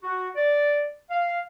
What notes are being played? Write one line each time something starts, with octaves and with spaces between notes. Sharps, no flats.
F#4
D5
F5